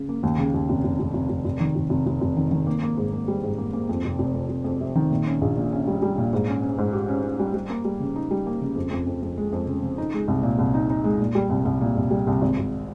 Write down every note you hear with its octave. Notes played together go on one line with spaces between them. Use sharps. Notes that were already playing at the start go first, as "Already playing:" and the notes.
Already playing: C#3
A#3
D#2
C#3
D#2
F1
F1
F1
F1
F1
F1
D#3
F1
F1
F1
F1
D#3
D#3
A#3
A#3
G#2
A#3
G3
G#2
A#3
A#3
F2
F1
F1
F2
F1
F2
C3
D#3
A#2
C#4
A#1
A#2
C#4
G3
G3
A#2
G#2
C#4
C#4
G#2
G4
C#4
C#4
G3
G3
A#3
G3
C#3
D#4
G3
A#3
C#3
F2
F2
F2
F2
G#3
F2
C#3
C#3
D#4
G#3
C2
A#2
C2
D#4
D#4
G#3
A#2
G3
C2
C2
A#2
C2
G3
C2
G#1
G#1